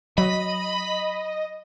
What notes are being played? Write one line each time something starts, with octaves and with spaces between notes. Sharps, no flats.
F#3 D#5 B5